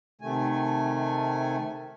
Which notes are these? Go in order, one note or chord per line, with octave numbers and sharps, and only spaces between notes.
C3 D#3 A3 G#5